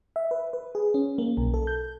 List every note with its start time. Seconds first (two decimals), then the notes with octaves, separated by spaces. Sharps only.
0.16 E5
0.31 B4
0.53 B4
0.75 G#4
0.94 C#4
1.18 A#3
1.37 B1
1.54 A4
1.67 G6